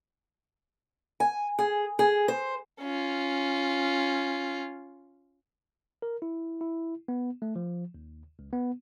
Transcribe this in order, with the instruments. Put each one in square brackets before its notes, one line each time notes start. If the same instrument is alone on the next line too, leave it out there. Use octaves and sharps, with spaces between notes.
[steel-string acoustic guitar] G#5
G#4
G#4
C5
[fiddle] C#4 F4
[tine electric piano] A#4
E4
E4
B3
A3
F3
D#2
C#2
B3